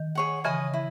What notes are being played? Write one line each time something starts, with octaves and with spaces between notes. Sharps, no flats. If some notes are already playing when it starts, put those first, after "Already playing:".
Already playing: D#3
G#4 C#5 F#5
C#3 E3 B4 D#5 G#5 D#6
E4